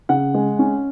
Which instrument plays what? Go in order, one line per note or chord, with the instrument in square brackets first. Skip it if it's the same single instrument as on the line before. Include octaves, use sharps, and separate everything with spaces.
[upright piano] C#3 F#5
G#3
C#4